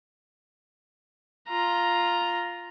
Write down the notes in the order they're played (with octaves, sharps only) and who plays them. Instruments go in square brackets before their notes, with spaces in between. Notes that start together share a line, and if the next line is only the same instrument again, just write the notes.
[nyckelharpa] F4 A#5